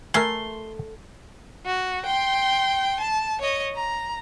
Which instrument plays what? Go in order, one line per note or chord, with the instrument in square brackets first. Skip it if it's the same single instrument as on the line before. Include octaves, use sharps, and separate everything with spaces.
[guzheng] A3 [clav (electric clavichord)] A#4 E5 G#5 [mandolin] C6
[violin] F#4
G5 C6
A5
C#5 D#5
A#5